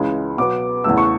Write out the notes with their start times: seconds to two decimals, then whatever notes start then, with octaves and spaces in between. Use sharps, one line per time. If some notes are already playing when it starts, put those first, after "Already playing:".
Already playing: C#2 C#3 E3 G#3
0.38 B2 F#3 B3 D6
0.84 E2 C#3 E3 A3 E6
0.98 C#6